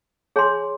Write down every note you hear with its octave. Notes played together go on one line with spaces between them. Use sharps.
G#4 C#5 G#5 C6